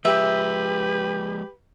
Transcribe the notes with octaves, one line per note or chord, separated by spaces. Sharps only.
F3 G#3 G4 B4 E5